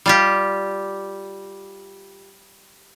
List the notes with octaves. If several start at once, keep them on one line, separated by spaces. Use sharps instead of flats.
G3 F4 G4